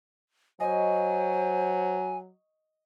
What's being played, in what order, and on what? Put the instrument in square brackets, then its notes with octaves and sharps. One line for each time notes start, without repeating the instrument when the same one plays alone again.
[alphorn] F#3 [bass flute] C5 [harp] D#5 C#6 [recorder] G#5